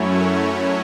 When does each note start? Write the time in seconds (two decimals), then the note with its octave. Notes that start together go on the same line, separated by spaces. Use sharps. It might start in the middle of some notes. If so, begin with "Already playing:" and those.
Already playing: F#2 F#3 A3 C#4 E4 C#5